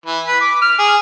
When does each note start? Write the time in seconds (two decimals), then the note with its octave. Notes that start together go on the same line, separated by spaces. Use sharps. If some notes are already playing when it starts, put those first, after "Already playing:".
0.06 E3
0.27 B4
0.41 D6
0.61 F6
0.79 G#4